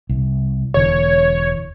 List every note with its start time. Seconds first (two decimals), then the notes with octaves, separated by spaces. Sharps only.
0.09 C2
0.74 E1 D3 E3 C#5